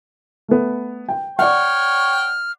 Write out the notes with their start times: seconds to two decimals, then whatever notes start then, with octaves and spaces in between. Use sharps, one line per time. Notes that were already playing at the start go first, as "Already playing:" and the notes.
0.48 A3 B3
1.09 G5
1.39 C#5 D5 F#5 G5 C#6 F6